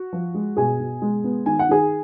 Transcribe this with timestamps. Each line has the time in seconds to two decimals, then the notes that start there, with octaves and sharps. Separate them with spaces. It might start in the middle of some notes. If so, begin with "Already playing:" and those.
Already playing: F#4
0.13 F3
0.34 G#3
0.57 B2 G#4 G#5
0.80 B2
1.02 G#3
1.24 B3
1.46 D#3 G#5
1.59 F#5
1.69 D#3 G#4 G#5